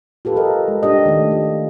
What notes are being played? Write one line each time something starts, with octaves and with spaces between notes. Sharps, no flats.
F4 G4 A4 B4
A4 A#4 D#5
G#3
D4 G4 D#5
D#3 A3
F4 G4